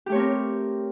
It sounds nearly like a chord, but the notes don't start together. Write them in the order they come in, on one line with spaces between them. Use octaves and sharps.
G4 A3 C#5 C4 A#4